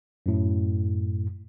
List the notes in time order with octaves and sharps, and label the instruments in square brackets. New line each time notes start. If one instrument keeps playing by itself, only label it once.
[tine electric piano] F#2 A2